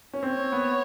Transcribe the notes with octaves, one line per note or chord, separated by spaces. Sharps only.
C#4
C4 C#5
B3